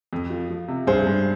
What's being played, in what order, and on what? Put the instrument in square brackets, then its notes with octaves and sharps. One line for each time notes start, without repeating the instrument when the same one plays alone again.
[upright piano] F2
F3
F3
C3
[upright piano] G2 [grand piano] G#4 C5
[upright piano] G2